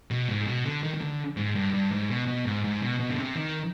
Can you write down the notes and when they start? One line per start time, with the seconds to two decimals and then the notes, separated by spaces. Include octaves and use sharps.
0.11 B2
0.29 G#2
0.47 B2
0.65 D3
0.83 D#3
0.94 D#3
1.01 D3
1.37 G#2
1.55 G2
1.73 G2
1.92 G#2
2.09 B2
2.28 B2
2.46 G#2
2.64 G#2
2.82 B2
3.00 B2
3.10 D3
3.18 C3
3.36 D#3